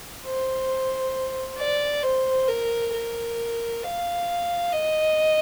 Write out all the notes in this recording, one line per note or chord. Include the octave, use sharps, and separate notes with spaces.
C5
D5
C5
A#4
A#4
F5
D#5